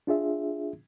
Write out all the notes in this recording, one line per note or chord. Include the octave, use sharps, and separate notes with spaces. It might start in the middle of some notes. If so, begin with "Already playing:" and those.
D4 F4 G#4 E5